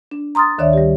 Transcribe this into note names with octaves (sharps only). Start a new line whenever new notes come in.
D4
A#5 C6 D#6 F6 A6
D2 D#3 D4 C#5 D5 E5
G3 G4